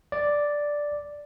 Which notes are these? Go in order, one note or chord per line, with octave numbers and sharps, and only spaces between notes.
D5